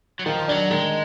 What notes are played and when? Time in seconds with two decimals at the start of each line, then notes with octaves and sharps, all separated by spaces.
0.19 F#3
0.26 D#3 F3
0.48 F#3 D4
0.71 D#3 G#3